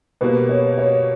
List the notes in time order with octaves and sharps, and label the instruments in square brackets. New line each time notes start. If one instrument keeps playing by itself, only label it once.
[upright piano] B2 G3 A#3 [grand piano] B4
[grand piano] C#5
C#5